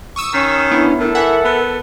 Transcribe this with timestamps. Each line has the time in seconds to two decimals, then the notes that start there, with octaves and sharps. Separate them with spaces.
0.16 C#6 D#6 E6
0.33 D#3 C#4
0.71 B3 D4 E4
0.99 A2 A4 A#4
1.15 E3 E5 F#5
1.45 B3